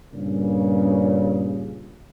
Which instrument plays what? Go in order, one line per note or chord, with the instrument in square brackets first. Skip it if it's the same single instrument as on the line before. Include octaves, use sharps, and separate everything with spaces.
[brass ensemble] G2 A#2 C#3